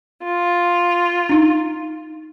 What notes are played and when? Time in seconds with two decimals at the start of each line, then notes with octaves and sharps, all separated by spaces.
0.22 F4
1.29 D4 D#4